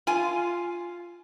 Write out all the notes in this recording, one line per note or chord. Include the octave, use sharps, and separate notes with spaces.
F4 G#5